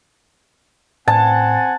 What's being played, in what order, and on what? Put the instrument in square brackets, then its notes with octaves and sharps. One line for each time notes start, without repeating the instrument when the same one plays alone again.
[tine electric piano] A2 [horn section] C4 F#5 G#5 [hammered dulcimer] A5